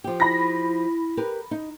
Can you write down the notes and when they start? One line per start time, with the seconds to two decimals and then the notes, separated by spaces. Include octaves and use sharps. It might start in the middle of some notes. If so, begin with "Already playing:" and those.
0.04 F3 G4
0.20 E4 B5 A#6
1.17 G4 A#4 B4
1.51 D#4